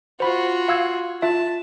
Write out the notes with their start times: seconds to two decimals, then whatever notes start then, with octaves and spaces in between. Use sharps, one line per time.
0.20 F4 F#4 C5 B5
0.68 F5 E6 G#6
1.22 F4 E5 A5